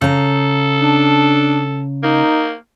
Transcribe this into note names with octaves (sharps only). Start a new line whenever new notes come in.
C#3 A4 A#5
D4
A#3 D#4